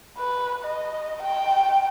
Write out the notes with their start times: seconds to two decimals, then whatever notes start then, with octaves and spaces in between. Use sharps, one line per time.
0.18 B4
0.64 D#5
1.22 G5